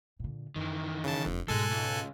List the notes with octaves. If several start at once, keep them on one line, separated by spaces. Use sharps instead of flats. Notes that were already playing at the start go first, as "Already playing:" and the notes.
A#2 D3
F#2 D#3 E3
C#3 A5
E1 F2 D4
G#2 B2 G#3 A4 G#5 F#6
C#2